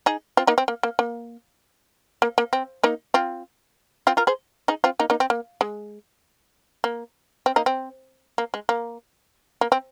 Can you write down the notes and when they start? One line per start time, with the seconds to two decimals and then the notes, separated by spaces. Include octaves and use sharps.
0.06 D#4 G#4
0.37 C4 F4
0.47 A#3 D#4
0.58 C4
0.68 A#3
0.83 A#3
0.99 A#3
2.22 A#3
2.38 A#3
2.53 C4
2.83 A#3 D#4
3.14 C4 F4
4.07 C4 F4
4.17 F4 A#4
4.27 G#4 C5
4.68 D#4 G#4
4.84 C4 F4
4.99 A#3 D#4
5.10 A#3 D#4
5.20 C4
5.30 A#3
5.61 G#3
6.84 A#3
7.46 C4
7.56 A#3 D#4
7.66 C4
8.38 A#3
8.54 G#3
8.69 A#3
9.61 A#3
9.72 C4